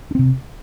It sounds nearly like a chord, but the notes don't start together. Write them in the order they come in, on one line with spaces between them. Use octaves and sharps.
D4 C4 C3